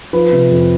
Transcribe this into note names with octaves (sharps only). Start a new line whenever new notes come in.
F3 B4
C3
F2